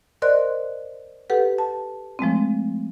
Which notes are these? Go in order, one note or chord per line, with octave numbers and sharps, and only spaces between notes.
A#4 C5 D5 D#5 C6 F#6
G4 A4 B4 F#5
A5
F3 G#3 A3 C4